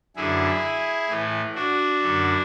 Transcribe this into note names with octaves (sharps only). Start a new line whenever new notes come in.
F#2 D3 E4 G#4
A2 E3
D4 F#4
F#2 D3